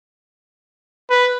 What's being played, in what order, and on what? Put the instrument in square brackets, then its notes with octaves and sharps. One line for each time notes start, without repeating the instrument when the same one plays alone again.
[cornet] B4